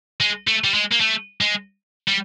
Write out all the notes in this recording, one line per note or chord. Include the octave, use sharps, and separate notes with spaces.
G#3
A3
G3
G#3
A#3
A3
G#3
G3